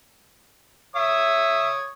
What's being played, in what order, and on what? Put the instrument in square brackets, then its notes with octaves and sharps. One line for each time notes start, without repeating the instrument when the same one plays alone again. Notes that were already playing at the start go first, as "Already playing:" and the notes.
[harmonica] C#5 D#6 [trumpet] E5